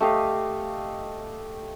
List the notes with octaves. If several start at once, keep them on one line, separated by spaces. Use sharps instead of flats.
A3 G4 D#5 F5